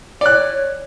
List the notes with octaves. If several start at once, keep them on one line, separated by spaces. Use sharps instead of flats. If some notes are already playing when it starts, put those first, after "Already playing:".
C#5 D5 F#6